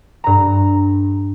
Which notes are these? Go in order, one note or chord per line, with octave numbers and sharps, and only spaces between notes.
G2 A#5